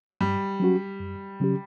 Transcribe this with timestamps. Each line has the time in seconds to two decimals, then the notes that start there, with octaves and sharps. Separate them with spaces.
0.21 G2 G3
0.60 F#3 C#4 F#4
1.00 F#2
1.40 C#3 F#3 C#4 G4